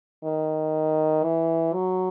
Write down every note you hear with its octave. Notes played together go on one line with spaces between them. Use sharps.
D#3
E3
F#3